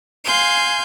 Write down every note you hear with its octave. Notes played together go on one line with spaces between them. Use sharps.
F5 G#5 C6 G6